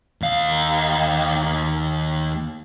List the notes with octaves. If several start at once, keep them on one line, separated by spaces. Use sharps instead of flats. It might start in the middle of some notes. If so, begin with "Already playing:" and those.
D#2 F5